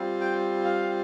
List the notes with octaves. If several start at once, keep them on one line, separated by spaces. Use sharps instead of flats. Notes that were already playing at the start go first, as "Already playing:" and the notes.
Already playing: G3 C4 F4
G5
F5